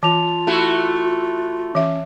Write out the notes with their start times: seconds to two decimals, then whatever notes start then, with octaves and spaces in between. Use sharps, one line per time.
0.03 E3 F4 A5 F7
0.47 A3 E4 F#4
1.75 E3 C#4 E5